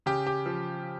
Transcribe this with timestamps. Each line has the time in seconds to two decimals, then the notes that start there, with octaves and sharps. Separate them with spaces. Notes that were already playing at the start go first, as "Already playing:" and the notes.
0.06 C#3 G4
0.27 G4
0.46 F3